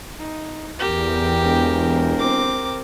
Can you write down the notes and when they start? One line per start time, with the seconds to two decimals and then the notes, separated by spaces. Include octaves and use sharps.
0.18 D#4
0.79 E2 G4 A#4 G5
1.44 E1
2.19 C4 D6